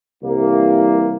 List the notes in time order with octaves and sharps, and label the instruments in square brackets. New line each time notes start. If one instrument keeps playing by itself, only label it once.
[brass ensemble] C2 E3 A#3